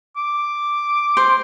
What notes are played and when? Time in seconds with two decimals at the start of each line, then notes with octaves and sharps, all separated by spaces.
0.16 D6
1.17 C5